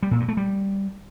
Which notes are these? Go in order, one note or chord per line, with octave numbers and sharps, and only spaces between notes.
G3
A#2
G2
A3
G3